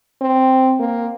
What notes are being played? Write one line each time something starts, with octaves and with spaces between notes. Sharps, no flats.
C4
A#3